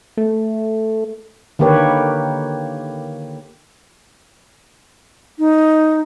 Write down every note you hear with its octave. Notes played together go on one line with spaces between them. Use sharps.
A3
D3 D#3 A#3 G4 B4 C#5
D#4